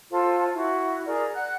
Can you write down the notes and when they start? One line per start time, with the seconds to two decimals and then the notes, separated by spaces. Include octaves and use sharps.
0.11 F4 A4 C5
0.54 E4 F#4
1.06 G#4 A#4 D5
1.34 F#5 F#6